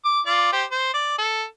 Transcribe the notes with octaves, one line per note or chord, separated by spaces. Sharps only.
D6
F4 D5 D6
G4 C5
C5
D5
A4